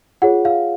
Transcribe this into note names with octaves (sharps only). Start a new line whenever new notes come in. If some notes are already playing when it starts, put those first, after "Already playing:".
F4 G#4 C#5 F#5
F5